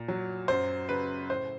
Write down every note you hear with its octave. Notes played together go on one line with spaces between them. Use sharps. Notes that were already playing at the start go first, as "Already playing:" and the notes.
Already playing: A#2
F#3
F#2 C5
C#3 B4
A2 C5